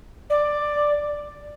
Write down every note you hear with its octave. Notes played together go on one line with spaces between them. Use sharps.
D5